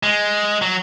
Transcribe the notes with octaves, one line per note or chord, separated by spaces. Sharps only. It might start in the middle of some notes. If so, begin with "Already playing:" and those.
G#3
F#3